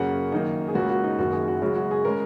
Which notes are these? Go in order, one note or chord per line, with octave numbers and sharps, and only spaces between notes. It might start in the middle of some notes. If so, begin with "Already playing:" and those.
Already playing: F#2 C#3 A#3 F#5
F#2 D#3 A#3 D#4
G#4
C#2 C#3 A#3 F#4
F#4
D#4
F#1 F#2 D#3 F#4
G#4
F#4
F#2 C#3 G#3 F#4
F#4
G#4
C#3 G#3 A#4